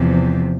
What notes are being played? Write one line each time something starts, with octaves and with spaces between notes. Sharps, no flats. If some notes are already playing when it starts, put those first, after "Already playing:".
Already playing: E2 C3 F3